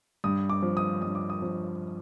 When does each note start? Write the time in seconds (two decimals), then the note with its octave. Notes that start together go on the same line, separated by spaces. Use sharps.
0.24 G2 D#6
0.49 D6
0.62 F3
0.77 D#6
1.02 G2 D#6
1.15 D6
1.30 D#6
1.42 F3